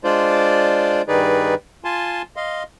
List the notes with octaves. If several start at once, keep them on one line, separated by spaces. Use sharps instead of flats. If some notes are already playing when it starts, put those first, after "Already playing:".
G#3 D4 F4 C5 D5
G2 D#3 D#4 G#4 B4 D5
F4 G#5 A5 C6
D#5 F5 C6